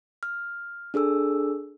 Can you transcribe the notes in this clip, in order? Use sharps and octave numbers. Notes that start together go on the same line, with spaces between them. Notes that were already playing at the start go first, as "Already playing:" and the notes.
F6
D4 G#4 A4 E6